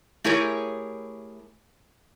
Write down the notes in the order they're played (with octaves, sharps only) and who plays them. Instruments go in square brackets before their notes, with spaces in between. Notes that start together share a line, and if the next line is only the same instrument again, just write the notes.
[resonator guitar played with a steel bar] A3 E4 G4 G#4 A#4 C#5